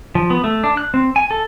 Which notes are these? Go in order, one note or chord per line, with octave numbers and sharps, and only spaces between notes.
F3
B3
A3
D4
F#6
C4
G#5
A4